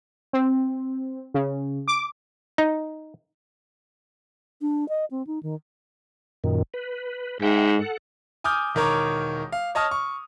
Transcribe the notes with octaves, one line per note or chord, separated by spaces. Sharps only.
C4
C#3
D6
D#4
D4
D#5
C4
D#4
D#3
F#2 A#2 D#3
B4
G#2 E5 F#5 G5
A4 F#5
G#5 D6 D#6 F6 G6
E1 D#3 A#4 C#5 A#5 D6
F5
C#5 D#5 A5 D#6 F6
C#6